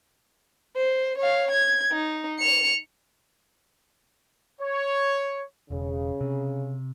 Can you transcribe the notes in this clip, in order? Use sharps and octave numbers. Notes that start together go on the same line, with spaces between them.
C5
C#5 F5
G#6
D#4
C#7 F7
C#5
E1 C#3
C3